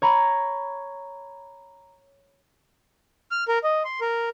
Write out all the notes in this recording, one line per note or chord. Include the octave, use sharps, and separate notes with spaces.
C#5 A#5 B5
F6
A#4
D#5
C6
A#4